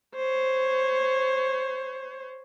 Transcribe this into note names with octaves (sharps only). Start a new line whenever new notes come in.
C5 C#5